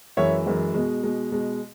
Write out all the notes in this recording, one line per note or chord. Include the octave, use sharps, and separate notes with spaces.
F#2 E3 G#3 C#5 E5
F#2 E3 G#3
B2 G#3
B2 G#3
B2 G#3